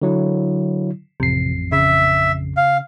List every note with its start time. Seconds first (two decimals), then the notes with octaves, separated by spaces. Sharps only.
0.02 D3 F#3 E4
1.20 A1 F2 C3 C7
1.72 C#3 E5
2.57 F5